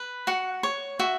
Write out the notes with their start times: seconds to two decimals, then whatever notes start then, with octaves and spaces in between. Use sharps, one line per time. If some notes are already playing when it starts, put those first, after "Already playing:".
Already playing: B4
0.27 F#4 F#5
0.63 C#5
0.99 F#4 E5